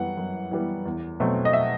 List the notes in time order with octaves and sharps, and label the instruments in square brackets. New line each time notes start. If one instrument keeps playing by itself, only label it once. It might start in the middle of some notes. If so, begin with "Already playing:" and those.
Already playing: [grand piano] F#2 E3 G3 B3 F#5
F#2
E3 G3 B3
E2
B2 F#3 A3 C4
D#5
E5